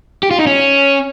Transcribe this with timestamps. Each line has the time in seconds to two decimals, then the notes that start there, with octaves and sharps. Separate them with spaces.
0.23 G4
0.31 F4
0.39 D#4
0.47 C#4